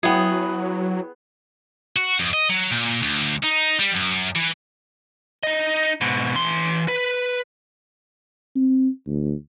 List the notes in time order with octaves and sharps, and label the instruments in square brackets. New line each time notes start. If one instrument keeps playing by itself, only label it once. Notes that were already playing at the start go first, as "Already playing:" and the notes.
[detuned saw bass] F#3 [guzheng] B3 G#4 [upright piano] E4 G5
[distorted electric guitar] F#4
F2
D#5
F#3
A#2
D2
D#4
G3
F#2
E3
[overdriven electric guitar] D#4 D#5
G#2 B2
E3 C6
B4
[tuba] C4
D2